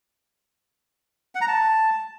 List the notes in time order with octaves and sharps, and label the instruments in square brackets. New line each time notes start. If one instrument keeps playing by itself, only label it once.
[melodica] F#5
A#5
A5